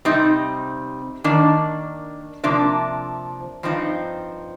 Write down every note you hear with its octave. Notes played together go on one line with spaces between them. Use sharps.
C3 G3 C4 D#4
D#3 A#3 D4
C3 F3 A#3 D4
G2 F3 C4 D#4